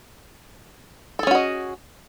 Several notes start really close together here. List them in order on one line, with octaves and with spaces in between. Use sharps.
A4 G#4 C#4 F#4 D#5